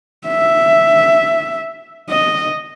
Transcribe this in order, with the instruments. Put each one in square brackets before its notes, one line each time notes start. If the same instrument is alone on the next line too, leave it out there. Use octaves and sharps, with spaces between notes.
[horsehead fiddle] E5
D#5